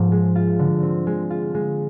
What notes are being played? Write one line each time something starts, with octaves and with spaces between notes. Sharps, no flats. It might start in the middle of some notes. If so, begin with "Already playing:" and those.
Already playing: G#2 F3
G#3
F4
D3
C4
G#3
F4
G#3